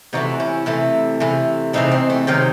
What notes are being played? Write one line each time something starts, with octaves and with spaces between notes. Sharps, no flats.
C3 E3 A3 D#4 F#4
C#4 E4
C3 E3 A3
C3 E3 A3
C3 E3 A3 C4 D#4
C4
A3
C3 D#3 F#3 C4